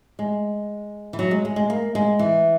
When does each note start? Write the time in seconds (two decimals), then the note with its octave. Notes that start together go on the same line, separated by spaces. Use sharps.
0.19 G#3
1.13 E3
1.19 F#3
1.31 G#3
1.45 G#3
1.56 G#3
1.70 A#3
1.95 G#3
2.19 E3